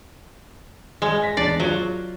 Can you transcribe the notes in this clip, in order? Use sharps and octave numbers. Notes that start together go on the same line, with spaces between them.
G#3
A#6 B6
E2 D4 D5 C7
F#3 F4